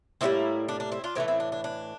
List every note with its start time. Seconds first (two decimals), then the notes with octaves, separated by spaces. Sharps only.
0.21 A2 E3 G3 A#3 C4 E4
0.68 D4
0.80 D4
0.92 C4 E4
1.04 D4 F4
1.15 A2 E3 A3 C4 E4
1.28 C4 E4
1.40 D4
1.52 D4
1.64 D4